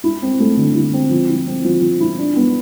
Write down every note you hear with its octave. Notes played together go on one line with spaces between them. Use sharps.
E4
C4
A3
D3
E4
C4
F3
E4
C4
F3
F3
E4
D4
B3